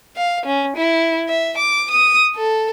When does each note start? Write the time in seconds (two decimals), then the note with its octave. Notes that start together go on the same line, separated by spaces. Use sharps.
0.16 F5
0.46 C#4
0.77 E4
1.28 E5
1.58 D6
1.91 D#6
2.35 A4